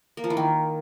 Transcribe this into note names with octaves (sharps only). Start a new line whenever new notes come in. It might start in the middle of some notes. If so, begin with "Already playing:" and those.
A#3
F3
E3
D#3